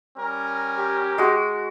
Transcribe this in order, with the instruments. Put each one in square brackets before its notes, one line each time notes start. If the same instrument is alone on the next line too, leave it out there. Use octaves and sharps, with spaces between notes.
[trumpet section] G3 C#4 A#4
[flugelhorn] G4
[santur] G#3 F#4